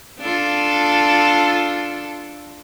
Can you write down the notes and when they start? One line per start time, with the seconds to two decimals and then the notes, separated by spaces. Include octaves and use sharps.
0.20 D4 F4 A4